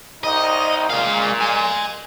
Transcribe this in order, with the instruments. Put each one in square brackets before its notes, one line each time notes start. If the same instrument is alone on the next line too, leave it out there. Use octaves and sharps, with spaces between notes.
[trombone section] C2 D#4 [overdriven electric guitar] D#5
[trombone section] A#2 [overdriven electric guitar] G#3 F5
[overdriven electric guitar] G#5 C6